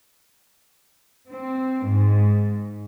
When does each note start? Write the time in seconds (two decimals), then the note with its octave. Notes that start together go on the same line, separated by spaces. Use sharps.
1.31 C4
1.86 G#2